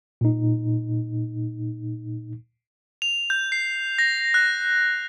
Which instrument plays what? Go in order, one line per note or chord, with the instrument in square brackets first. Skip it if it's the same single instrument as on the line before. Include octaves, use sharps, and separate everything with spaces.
[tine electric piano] A#2 D#4
[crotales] F7
G6
C7
A#6
F#6